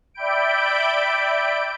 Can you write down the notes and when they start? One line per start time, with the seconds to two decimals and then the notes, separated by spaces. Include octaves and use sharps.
0.14 D5 E5 G5 B5 G6 D7